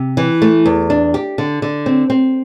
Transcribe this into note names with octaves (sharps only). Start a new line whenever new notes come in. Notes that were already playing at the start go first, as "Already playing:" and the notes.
Already playing: C3
E3
A3
E2
D4
G4
D3
D3
C4
C4